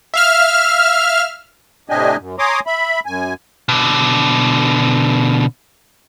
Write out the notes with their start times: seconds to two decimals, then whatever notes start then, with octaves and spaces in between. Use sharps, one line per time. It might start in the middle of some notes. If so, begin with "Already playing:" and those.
0.14 E5 F5 F6
1.89 A2 C3 D4 G4 D#5 G#5
2.18 F#2
2.39 C#5 G#5 A#5 C6 D6 D#6
2.67 E5 B5
3.06 F#2 G#5
3.69 B2 D3